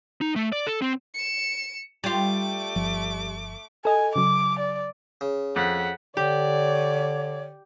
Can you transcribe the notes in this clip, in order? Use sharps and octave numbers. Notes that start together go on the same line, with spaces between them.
D#4
A3
D5
A4
C4
C#7 E7
G3 A3 F4 D6
G1 F3
A4 D#5 G#5
C#3 F#3 D6
D5
C#3
F2 F#5 B6
D3 G4 C#5 D5